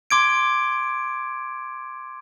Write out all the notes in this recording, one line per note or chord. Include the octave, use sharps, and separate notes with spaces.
C6 D6 G#6 D7